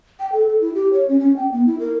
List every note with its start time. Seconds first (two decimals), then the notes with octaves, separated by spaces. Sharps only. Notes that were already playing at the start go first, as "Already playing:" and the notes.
0.19 G5
0.33 A4
0.47 A4
0.61 E4
0.74 G4
0.93 C#5
1.09 C#4
1.20 C#4
1.37 G5
1.52 B3
1.66 E4
1.80 A#4